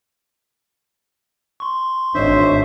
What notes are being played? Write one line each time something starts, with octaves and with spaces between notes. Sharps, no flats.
C6 C#6
G#1 D4 C5 C#5 D#5 E5